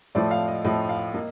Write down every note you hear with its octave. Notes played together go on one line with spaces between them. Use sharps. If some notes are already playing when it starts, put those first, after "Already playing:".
A2 F3 A3 D5
F5
D#5
A2 F3 A3 D#5
F5
A#3 D#5